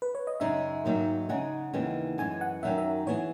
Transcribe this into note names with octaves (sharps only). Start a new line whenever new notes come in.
B4
C#5
D#5
F#2 C#3 G#3 D#4 E5
G#2 D#3 F#3 A#3
C#3 G#3 D#4 G#4 F#5
D#2 C#3 E3 G#3 B3
F#2 E3 G#3 G#5
F#5
F#2 D#3 F#3 C#4 E5
E5
E3 B3 E4 G#4 C#5